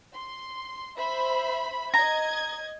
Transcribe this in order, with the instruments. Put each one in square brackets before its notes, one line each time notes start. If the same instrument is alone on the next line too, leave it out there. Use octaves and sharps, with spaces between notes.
[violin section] C6
C5 E5 B5
[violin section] D#5 G#6 [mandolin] A#5